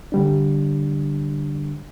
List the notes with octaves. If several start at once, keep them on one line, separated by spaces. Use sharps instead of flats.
D3 G3 D4